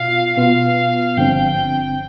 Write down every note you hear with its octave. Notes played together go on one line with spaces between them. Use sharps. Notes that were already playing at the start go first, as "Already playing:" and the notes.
Already playing: B2 F4 F5
B2 B3 F4 F5
G1 G2 D3 F3 C4 G5